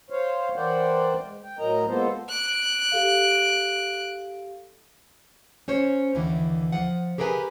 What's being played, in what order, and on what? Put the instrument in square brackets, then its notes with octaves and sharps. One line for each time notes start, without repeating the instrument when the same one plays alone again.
[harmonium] C5 C#5 F5
E3 A#4 C5 D5 F#5 G5
G#3
G5
A2 F#3 A#4 D#5 A#5
G#3 A#3 B3 F4 A4 C5
[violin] F#6 D7
[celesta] G4 A4 F5
[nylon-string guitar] C#4 C5 C#5
D#2 D3 E3
F3 F#5
G4 G#4 A#4 B4 G5 G#5